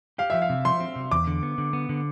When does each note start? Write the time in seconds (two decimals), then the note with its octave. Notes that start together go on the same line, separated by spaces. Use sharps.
0.18 G4 F5
0.30 F3 E5
0.42 F5
0.50 C3
0.65 F3 C6
0.80 C4
0.96 C3
1.11 E2 D6
1.27 D3
1.43 B3
1.58 D3
1.73 B3
1.89 D3